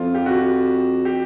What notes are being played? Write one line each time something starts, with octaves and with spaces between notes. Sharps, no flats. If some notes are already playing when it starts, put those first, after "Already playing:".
Already playing: F2 F4
G4
F#4
G4